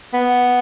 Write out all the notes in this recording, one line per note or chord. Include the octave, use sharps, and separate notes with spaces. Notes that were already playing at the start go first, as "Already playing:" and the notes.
B3